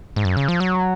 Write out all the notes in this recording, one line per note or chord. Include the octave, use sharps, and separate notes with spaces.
G#2
F#2
C#3
F3
F#3